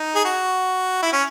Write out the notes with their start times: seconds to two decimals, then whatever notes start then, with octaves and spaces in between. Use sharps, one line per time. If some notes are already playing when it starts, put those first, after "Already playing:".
Already playing: D#4
0.15 G#4
0.25 F#4
1.03 E4
1.13 C#4